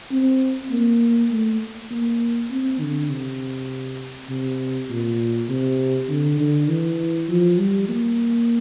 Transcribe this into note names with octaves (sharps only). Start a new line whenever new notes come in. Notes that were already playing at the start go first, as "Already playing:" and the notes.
C4
A#3
A3
A#3
C4
D3
C3
C3
A#2
C3
D3
D3
E3
F3
G3
A#3